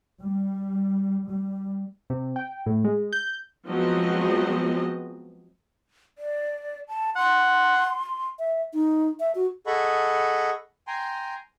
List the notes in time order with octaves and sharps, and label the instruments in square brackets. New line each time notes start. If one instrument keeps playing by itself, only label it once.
[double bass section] G3
G3
[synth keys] C3
G5
A2
G#3
G6
[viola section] F3 F#3 G#3 B3 C4 D#5
[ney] D5
A5
[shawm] F#5 [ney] C6
[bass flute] E5
D#4
E5
F#4
[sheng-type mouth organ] G#4 A4 D#5 F#5 B5 C#6
G5 G#5 A#5 C6